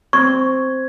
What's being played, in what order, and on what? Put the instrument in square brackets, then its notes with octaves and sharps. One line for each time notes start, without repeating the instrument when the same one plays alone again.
[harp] C4 [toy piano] C#6 [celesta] G#6